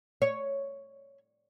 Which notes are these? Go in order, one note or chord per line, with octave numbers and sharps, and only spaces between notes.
C#5